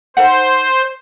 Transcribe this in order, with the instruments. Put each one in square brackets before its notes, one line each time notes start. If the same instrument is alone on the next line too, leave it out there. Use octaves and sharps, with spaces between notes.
[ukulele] D#4 A4 F#5 [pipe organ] C5